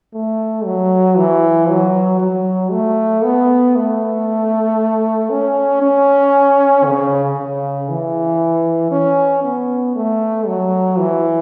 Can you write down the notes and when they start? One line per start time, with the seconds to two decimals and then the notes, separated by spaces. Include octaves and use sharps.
0.14 A3
0.65 F#3
1.17 E3
1.69 F#3
2.20 F#3
2.72 A3
3.24 B3
3.76 A3
5.30 C#4
5.82 C#4
6.86 C#3
7.37 C#3
7.89 E3
8.92 C#4
9.44 B3
9.96 A3
10.47 F#3
10.99 E3